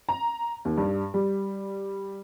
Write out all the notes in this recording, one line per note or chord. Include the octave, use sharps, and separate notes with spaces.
A#5
D#2
G2
G3